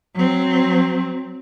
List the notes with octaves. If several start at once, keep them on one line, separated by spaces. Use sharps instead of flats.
F#3 C4